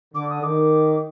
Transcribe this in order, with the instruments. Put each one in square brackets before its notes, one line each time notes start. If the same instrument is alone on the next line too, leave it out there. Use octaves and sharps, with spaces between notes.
[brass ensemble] D3 [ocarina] D6
[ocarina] D#6
[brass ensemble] D#3 [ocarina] D6